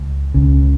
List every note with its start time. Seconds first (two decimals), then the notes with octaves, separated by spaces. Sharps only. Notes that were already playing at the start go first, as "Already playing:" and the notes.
Already playing: C#2
0.34 C#2 C#3